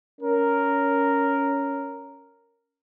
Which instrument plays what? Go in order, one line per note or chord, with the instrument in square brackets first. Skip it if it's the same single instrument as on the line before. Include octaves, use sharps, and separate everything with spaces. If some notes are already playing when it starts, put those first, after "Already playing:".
[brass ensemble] C#4 A#4